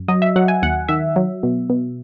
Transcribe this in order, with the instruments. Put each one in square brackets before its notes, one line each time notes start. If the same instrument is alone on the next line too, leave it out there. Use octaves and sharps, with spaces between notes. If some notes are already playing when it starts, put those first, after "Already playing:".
Already playing: [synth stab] F#2
F#3 D#5
E5
F#3 F#5
G#5
D#2 F#5
D#3 E5
F#3
B2
B2